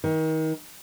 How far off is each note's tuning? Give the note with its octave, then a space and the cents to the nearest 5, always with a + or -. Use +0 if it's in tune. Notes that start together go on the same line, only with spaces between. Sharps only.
D#3 +30